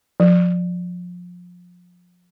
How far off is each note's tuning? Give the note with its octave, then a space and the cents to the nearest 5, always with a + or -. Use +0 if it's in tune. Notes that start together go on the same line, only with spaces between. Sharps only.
F3 +25